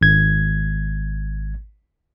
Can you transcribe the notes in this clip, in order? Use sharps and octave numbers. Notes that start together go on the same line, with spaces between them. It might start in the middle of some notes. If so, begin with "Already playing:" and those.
G#1 G#6